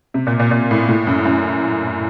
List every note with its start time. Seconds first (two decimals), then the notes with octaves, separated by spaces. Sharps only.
0.14 C3
0.27 A#2
0.39 A#2
0.51 A#2
0.71 A2
0.89 A2
1.07 F#2
1.25 F#2